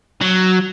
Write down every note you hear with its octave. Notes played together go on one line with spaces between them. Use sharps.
F#3